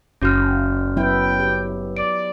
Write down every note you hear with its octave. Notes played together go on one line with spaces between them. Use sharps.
F#1 C#4 F#4 F6
F#3 B3 E4 G5
G4
D5 D7